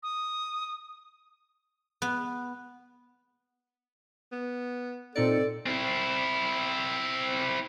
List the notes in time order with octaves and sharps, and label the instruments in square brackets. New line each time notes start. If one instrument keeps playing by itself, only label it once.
[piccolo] D#6
[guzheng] B3
[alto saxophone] B3
[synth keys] A#2 D#4 C#7 [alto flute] C4 [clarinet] A4 [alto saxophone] D5
[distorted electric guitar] C4 E4